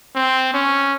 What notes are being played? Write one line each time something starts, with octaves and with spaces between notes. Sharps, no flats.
C4
C#4